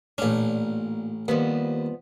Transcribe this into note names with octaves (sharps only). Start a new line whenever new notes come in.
A1 A#2 C#4 D4
D#2 F3 G3 B3